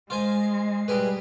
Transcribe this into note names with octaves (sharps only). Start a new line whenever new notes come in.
G#3 F4 C5 G#5
G3 G#4 B4